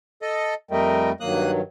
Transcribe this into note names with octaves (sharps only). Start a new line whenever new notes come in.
A4 D#5
F2 G3 A3 A#4 D#5 G5
G2 D#3 F#3 A#3 D#6 F#6